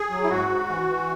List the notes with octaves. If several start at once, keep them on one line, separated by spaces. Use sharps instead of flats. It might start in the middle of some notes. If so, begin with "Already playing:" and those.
Already playing: G#4
F#3
E4
G#2 F#4
G#2
E3
E3